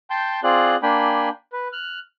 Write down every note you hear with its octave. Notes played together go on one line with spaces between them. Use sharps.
G5 A5 C6 G6
C4 F4 G#4 D5 F#6
A#3 D4 G5 G#5 B5
B4
F6 F#6